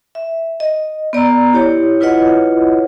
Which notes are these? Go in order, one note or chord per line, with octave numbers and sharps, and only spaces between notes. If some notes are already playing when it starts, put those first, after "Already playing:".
E5
D#5
B3 D5 A#5 E6
E4 G4 C#5
E4 F4 B4 C#5 D#5 F#5